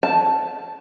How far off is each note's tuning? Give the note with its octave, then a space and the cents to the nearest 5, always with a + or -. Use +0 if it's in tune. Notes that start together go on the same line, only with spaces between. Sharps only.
A5 -5